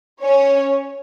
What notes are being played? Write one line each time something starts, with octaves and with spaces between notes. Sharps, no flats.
C#4 C#5